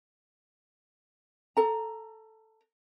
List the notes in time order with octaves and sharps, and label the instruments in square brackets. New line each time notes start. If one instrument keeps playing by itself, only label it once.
[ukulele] A4 A#5